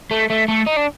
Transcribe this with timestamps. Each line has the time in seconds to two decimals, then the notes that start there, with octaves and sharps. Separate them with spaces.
0.11 A3
0.30 A3
0.48 A3
0.67 D#4
0.77 D4